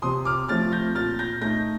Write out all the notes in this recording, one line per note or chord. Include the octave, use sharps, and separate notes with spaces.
C3 C6 D#6
D6 F6
F3 A3 C4 F6 A6
G6 A#6
A#2 F6 A6
G6 A#6
A3 D#4 G6 A#6